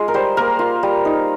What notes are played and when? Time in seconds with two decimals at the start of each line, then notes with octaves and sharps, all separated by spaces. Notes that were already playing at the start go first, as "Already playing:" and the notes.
Already playing: G#3 F4
0.08 A#4
0.14 G3 C5
0.37 A#3 A#4
0.59 F4
0.83 G3
1.05 D#4